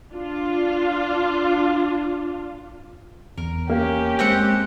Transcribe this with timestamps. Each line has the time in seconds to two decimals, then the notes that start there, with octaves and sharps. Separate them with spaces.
0.12 D4 F4
3.38 E2 A#4
3.70 A#3 C#4 G4
4.19 G#3 C4 C5 F#5 G6